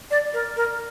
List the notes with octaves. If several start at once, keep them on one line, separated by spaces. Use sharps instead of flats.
D5
A#4
A#4